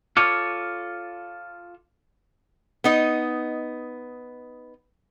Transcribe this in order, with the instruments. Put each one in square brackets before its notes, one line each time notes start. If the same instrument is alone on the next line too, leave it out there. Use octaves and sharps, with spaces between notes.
[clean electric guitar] F4 A4 C#5 [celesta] D6 F6 C#7
[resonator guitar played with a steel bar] B3 D#4 D#5